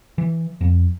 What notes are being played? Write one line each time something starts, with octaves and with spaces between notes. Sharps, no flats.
E3
F2